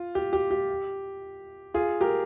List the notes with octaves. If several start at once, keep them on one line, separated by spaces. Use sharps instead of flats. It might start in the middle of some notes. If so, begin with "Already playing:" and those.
Already playing: F4
G4
G4
G4
F4 G#4
G4 A#4